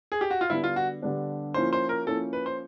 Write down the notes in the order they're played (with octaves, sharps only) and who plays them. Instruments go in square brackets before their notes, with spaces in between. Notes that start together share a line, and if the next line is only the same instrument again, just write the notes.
[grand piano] G#4
G4
F#4
F4
[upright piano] D3 G3 B3 D4 [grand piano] E4
[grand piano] F4
F#4
[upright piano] D3 G3 B3 D4
[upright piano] F3 A#3 C#4 E4 [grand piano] C5
[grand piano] C5
A#4
[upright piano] F3 A#3 C#4 E4 [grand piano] A4
[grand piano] B4
C5